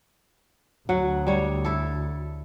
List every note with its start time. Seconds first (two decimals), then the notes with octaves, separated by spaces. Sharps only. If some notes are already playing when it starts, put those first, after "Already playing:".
0.89 D2 F#3 F#5
1.27 G3 C#5
1.65 E4 A4